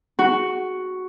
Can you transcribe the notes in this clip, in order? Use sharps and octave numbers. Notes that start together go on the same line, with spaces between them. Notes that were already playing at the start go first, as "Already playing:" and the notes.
F#4